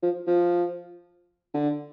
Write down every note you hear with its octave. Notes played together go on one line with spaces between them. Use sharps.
F3
F3
D3